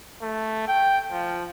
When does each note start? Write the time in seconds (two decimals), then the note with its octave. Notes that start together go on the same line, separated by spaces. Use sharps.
0.22 A3
0.68 G5
1.12 F3